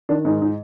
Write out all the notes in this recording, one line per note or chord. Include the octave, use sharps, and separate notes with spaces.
D#3 D4
G#2 D#4
D#4